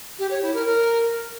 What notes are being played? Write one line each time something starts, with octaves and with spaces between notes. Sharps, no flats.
G4
C#5
E4
A#4
A#4